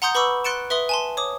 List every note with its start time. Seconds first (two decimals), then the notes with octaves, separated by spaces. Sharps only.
0.02 F#5 A#5 C6 D#6 G6 C#7
0.15 B4 B5 C#6 D6 E6
0.44 C6 F#6 A6 C#7 D7 E7
0.70 B4 E5 C6 D#6 G7
0.89 G#5 A5 C6
1.17 C#5 D6 D#6